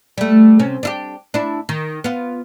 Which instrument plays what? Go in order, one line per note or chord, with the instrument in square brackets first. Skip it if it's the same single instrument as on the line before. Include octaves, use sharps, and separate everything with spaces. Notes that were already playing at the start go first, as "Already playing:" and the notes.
[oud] G3 A3
C3 C#4
D4 E4 G4
D4 E4
D#3
B3 F4